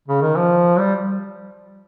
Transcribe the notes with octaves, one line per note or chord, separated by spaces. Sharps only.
C#3
D#3
F3
G3